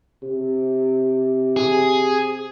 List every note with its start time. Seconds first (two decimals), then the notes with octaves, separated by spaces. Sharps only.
0.23 C3
1.57 G#4